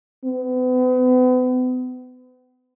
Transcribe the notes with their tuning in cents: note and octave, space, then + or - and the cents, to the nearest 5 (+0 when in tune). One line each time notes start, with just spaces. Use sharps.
B3 +40